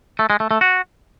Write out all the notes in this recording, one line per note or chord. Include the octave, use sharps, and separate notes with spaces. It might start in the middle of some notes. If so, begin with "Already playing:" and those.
A3
G#3
A3
A3
F#4